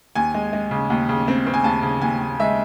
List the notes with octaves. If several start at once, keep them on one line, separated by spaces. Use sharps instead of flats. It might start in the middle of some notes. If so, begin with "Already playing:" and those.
D#2 G#5
G#3
G#3
C#3
D#2
C#3
C4
C4
G#5
D#2 A5
C#3
D#2 G#5
D#2
G#3 E5